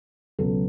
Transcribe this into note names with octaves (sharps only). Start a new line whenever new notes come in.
C#2 B2 F#3 B3 A4